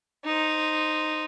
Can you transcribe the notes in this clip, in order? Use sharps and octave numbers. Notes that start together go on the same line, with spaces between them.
D#4 C5